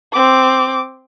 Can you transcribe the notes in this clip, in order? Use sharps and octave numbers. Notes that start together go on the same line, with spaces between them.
C4 D6